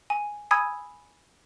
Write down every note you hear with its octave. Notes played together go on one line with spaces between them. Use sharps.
G#5
G#5 B5 D#6 E6 G#6